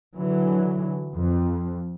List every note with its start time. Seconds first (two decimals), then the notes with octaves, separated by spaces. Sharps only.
0.16 D3 E3 F#3
1.14 F2